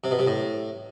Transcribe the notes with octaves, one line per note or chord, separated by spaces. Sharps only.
C3
B2
C3
A2